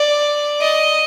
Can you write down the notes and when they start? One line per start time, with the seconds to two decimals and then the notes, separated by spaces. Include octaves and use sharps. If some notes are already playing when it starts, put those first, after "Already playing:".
Already playing: D5
0.60 D#5